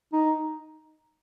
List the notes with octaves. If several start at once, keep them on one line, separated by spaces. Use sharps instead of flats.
D#4